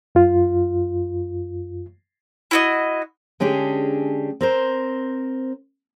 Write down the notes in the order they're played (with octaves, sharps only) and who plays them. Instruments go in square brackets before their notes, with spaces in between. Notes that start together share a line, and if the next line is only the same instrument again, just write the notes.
[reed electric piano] F#2 F4
[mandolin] E4 F#4 D#5
[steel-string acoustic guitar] D3 G#3 C#4 D4 G4 G#4
C4 A#4 C5